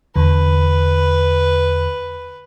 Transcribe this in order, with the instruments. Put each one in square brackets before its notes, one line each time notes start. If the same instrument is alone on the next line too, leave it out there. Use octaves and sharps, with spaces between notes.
[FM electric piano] E2 D3 [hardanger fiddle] B4